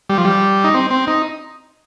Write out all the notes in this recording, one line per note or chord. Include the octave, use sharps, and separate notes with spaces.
G3
F3
G3
D#4
C4
C4
D#4